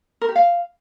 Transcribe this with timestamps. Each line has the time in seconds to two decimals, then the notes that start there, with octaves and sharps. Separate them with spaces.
0.21 A#4
0.29 G4
0.36 F5